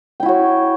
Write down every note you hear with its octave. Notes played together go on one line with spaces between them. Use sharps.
E4 F#4 C#5 G5